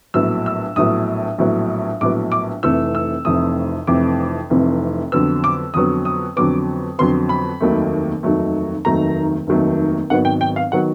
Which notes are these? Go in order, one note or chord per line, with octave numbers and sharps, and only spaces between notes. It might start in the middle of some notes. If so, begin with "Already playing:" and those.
A#1 A2 F#3 B3 E6
E6
A#1 A2 F#3 B3 D#6
A#1 A2 F#3 B3
A#1 A2 F#3 B3 D6
D6
F1 F2 C3 E3 A3 E6
E6
F1 F2 C3 E3 A3 D#6
F1 F2 C3 E3 A3 D6
F1 F2 C3 E3 A3
F2 D3 F#3 B3 E6
D6
F2 D3 F#3 B3 D#6
D#6
F2 D3 F#3 B3 D6
F2 D3 F#3 B3 C6
B5
F1 D#2 D#3 F#3 A3
F1 D#2 D#3 F#3 A3
F1 D#2 D#3 F#3 A3 A#5
F1 D#2 D#3 F#3 A3
G#1 G#2 D#3 F#3 B3 F#5
G5
G5
F5
D#3 F#3 B3 F#5